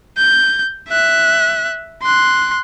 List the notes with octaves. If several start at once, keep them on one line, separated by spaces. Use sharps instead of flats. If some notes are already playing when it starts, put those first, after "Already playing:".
G6
E5 F#6
C6 F#6